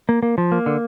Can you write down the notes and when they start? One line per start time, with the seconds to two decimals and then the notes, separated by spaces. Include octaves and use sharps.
0.09 A#3
0.23 A#3
0.38 F3
0.52 A#3
0.66 D3